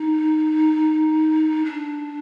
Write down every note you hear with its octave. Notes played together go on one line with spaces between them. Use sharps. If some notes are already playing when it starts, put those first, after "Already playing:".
Already playing: D#4
D4